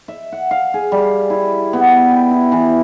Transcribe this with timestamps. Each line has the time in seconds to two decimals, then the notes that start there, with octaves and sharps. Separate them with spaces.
0.08 E5
0.32 F#5
0.51 F5
0.74 G#4
0.92 G3
1.30 E4
1.73 B3
2.11 G5
2.31 E4
2.52 E3